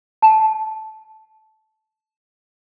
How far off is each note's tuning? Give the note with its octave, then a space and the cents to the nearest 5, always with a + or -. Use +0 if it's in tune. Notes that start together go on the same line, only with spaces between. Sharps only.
A5 -15